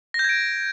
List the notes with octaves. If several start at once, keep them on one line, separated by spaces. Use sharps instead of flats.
A#6
G6
G#6
D7